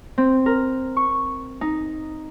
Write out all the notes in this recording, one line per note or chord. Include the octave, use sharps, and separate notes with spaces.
C4
A#4
C#6
D#4